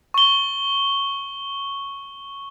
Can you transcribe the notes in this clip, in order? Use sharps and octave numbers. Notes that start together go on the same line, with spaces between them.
C#6 G7